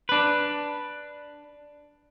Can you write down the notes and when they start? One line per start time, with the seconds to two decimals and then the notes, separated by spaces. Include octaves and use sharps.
0.09 D4 B4